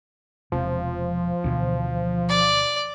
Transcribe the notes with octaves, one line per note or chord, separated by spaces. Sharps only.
E1 C3 F3
D2 B2 E3
D5